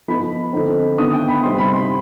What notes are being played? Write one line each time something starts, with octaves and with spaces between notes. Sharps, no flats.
F3 B3 D#4 B5
D3 F3 C4 D#4
D#3 B3 D4 D#6
G5
B5
C3 G3 C4 D#4 C6
B5
C6